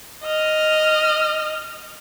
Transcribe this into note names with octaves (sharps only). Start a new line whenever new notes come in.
D#5 F6